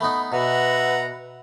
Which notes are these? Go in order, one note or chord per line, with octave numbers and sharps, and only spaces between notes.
A3 B3 D#4 B5
B2 B4 E5 F#5 A#5